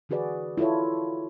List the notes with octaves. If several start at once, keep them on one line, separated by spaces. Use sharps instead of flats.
D3 E3 F#4 G#4 B4 D5
E4 F4 A4 C#5